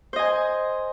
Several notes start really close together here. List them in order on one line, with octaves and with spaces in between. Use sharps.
C5 D#5 G#5